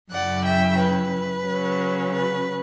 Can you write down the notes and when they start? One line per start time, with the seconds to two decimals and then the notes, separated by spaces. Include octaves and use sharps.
0.11 F#2 C#3 F#3 C#4 E4 D5 F#5
0.45 E5 G5
0.80 B4
1.46 C#3 F#3 C#4
2.14 B4